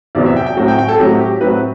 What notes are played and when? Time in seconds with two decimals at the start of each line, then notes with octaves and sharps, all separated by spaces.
0.15 E2 C3 F#3 B3 D5
0.26 E5
0.36 G5
0.46 G5
0.57 A2 F#3 C4
0.68 G5
0.79 G5
0.88 A4
0.99 A2 F#3 C4 G4
1.21 G4
1.41 A2 F#3 C4 B4